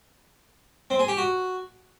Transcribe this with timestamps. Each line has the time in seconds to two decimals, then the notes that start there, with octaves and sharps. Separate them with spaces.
0.90 C4
0.99 G#4
1.08 G4
1.17 F#4